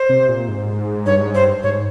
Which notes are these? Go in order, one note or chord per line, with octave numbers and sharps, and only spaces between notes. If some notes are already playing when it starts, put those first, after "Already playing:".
Already playing: C5
C3
A#2
G#2
G2 C#5
G#2
G2 C5
G#2 C#5